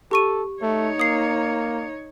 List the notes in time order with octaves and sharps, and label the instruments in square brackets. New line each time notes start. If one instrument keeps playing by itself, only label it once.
[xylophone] G4 C#6 D#7 [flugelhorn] A4
[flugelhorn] A3 [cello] D#4 C#5
[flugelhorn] A#3 [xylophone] D#6 C7